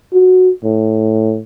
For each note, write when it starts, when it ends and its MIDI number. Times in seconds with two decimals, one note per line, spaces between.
0.13 0.51 66
0.64 1.40 45